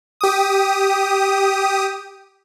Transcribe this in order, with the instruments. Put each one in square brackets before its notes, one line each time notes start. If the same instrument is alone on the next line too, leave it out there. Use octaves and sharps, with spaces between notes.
[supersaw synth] G4 D#6